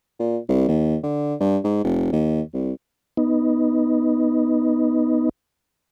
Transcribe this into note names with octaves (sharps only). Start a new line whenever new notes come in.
A#2
C2
D#2
D3
G2
G#2
F1
D#2
C2
B3 D#4